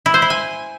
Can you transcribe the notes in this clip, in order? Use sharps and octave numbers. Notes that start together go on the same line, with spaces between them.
E4
C5
E4
G#5